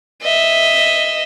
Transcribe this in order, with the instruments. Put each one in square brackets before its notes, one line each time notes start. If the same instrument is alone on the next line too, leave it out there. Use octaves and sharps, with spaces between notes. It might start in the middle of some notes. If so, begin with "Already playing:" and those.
[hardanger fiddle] D#5 E5